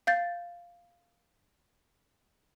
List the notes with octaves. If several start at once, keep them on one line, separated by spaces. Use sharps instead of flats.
F5 G6 A6